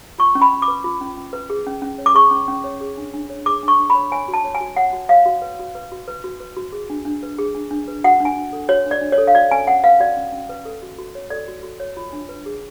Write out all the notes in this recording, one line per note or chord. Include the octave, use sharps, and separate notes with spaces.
F4 C#6
C#4
B5
C#4
D6
B4
F4
C#4
C#4
B4
G#4
C#4
C#4
C#5
D6
G#4 C#6
C#4
C#4
C#5
G#4
D4
D4
C#5
G#4 D6
D4
C#6
D4
B5
C#5
C#5 G#5
F#4
A5
C#5
G#5
F#4
C#5 F#5
F#4
C#5 F5
F#4
B4
F#4
B4
F#4
B4
F#4
B4
F#4
G#4
D4
D4
B4
G#4
D4
D4
B4
F#4 F#5
D4
G#5
D4
A4
F#4 C#5
D4
D5
D4
C#5
A4
F5
F#4 D5
C#4 G#5
C#4 F#5
B4 F5
F#4 D5
C#4
C#4
B4
A4
F#4
F#4
C#5
A4 D5
F#4
F#4
C#5
F4
D4
B4
G#4